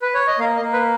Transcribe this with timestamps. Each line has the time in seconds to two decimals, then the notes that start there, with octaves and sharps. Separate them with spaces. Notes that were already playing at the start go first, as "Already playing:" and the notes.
0.02 B4
0.14 C#5
0.27 D#5
0.39 A#3 F5
0.56 D#5
0.61 A#3
0.73 B4